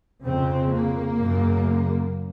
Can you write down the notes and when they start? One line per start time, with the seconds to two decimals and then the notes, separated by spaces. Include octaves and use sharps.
0.25 F2 C#3 C4
0.71 A#3
1.17 F#2 C#3